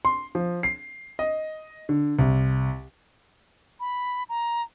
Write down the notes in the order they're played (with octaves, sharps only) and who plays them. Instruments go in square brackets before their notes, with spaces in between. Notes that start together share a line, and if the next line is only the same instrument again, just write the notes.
[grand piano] C6
F3
C7
D#5
D3
C2
[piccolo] B5
A#5